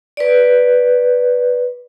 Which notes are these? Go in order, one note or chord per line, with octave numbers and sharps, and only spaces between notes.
B4 D5